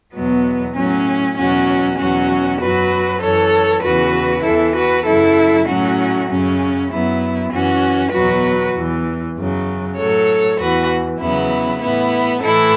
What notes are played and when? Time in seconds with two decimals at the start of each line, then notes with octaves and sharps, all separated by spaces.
0.14 E2 B2 F#3 B3
0.76 A2 F#3 C#4
1.37 E2 B2 F#3 C#4 F#4
1.99 E2 B2 F#3 C#4 F#4
2.60 F#2 F#3 F#4 B4
3.21 F#2 E3 A4 C#5
3.83 E2 C#3 E3 F#4 B4
4.44 E2 E3 E4 A4
4.75 F#4 B4
5.06 F#2 C#3 F#3 E4 A4
5.67 A2 F#3 C#4 F#4
6.28 F#2 C#3 F#3 C#4
6.90 F#2 F#3 B3 E4
7.51 F#2 E3 C#4 F#4
8.12 E2 B2 F#3 F#4 B4
8.74 E2 E3
9.36 F#2 C#3 F#3
9.97 A2 F#3 A4 C#5
10.59 E2 E3 F#4 B4
11.20 E2 C#3 F#3 B3 E4
11.81 A2 E3 B3 E4
12.43 A2 E3 E4 A4